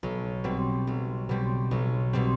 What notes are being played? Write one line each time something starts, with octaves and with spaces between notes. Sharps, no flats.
B1
B2 G3 C4
B1
B2 G3 C4
B1
B2 G3 C4